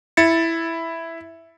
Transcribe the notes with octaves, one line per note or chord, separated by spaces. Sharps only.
E4 A6 C#7